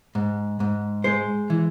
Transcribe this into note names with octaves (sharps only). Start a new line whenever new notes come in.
G#2
G#2
G#3 C5
E3